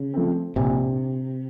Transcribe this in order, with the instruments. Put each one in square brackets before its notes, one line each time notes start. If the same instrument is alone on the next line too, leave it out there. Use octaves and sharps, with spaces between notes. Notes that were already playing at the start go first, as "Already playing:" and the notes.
Already playing: [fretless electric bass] C#3
[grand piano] F3 A3 C4
[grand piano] A#1 [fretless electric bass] C3